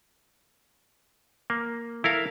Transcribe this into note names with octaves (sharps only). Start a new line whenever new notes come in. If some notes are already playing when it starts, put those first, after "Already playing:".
A#3
E4 A4 A#4 F5